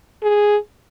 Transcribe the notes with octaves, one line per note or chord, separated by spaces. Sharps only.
G#4